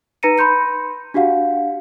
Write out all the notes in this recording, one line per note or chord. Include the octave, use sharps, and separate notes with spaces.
D#4 B4 A#5 A#6 C#7 D#7
B5 C6 G6 C#7
D4 F#4 G4 F5 F#5